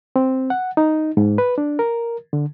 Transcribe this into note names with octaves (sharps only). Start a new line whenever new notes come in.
C4
F#5
D#4
G#2
B4
D4
A#4
D3